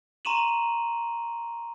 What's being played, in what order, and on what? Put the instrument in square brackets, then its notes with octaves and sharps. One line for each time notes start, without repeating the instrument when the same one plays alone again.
[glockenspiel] A#5 C6 C#6 D#7 E7 F#7